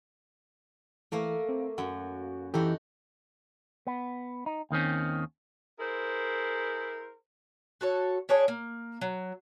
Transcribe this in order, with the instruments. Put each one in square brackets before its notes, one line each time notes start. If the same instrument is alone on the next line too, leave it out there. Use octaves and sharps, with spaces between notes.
[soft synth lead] E3 [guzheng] A3 A#3
[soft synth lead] C4
[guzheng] F#2 [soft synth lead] F#4
[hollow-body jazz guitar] E3 G4 [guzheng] D#4 F#4 [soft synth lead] A4
[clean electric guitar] B3
D#4
D#2 D#3 C4 C#4
[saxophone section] E4 G#4 A#4 C5
[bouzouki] F#4 A4 C#5
C#4 D4 G#4 C#5
A#3
F#3